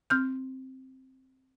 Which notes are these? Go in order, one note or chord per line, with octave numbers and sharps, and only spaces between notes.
C4 F6 G6